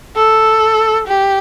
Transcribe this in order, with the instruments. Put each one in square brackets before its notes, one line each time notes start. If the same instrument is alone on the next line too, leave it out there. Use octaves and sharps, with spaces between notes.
[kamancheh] A4
G4